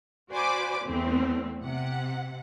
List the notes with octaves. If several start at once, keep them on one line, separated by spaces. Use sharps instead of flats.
F#4 C5 D5 G#5 B5 D6
E2 A3 C4
C3 F#5